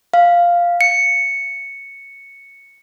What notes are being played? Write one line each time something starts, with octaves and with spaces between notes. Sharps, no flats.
F5
C#7